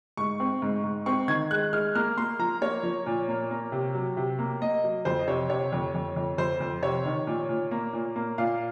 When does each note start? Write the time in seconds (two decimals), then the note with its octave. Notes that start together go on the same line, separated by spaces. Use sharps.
0.17 G#2 C#6
0.40 C4
0.62 G#2
0.84 G#2
1.06 C4 C#6
1.28 D#3 G#6
1.51 G#3 F#6
1.73 G#3 F6
1.95 A#3 F6
2.17 A#3 C6
2.39 F3 A#5
2.61 A#3 C#5
2.83 F3
3.06 A#2
3.28 A#3
3.51 A#3
3.72 C3
3.95 F#3
4.17 C3
4.39 A#3
4.61 A#3 D#5
4.84 F#3
5.05 F2 C5
5.19 D#5
5.28 C3 C#5
5.49 C3 C#5
5.73 F2
5.95 F2
6.16 F2
6.38 F2 C5
6.60 F2
6.82 C3 C#5
7.05 D#3
7.27 A#2
7.49 A#2
7.71 A#3
7.93 A#2
8.16 A#3
8.38 A#2 F5